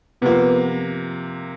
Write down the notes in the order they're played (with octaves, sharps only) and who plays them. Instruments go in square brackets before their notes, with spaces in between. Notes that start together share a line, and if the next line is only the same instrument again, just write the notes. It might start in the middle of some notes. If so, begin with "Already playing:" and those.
[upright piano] C3 F3 A#3 [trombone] B3